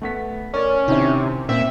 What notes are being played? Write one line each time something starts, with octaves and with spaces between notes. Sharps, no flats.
A3 B3 B6
C#4 A#4 D5
C3 D#3 C4 E4
A#2 C4 E5